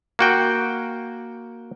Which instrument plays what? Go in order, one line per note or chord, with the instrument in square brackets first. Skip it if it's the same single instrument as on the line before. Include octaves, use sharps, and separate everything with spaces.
[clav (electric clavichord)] A#3 F#4 G5